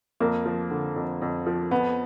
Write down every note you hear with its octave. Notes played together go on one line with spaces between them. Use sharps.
F2 A#3
F3
D3
F2
F2
F3
F2 B3